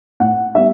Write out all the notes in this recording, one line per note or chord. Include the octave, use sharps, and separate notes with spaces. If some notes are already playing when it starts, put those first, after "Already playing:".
A2 F#5
G3 B3 E5